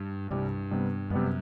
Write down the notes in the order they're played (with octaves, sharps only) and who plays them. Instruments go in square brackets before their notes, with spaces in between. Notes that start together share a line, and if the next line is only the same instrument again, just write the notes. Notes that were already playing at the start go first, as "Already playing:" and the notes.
Already playing: [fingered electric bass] G2
[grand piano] C2 C3 G3 [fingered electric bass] G2
[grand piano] C3 G3 B3
[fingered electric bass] F#2 [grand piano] C3 G3 B3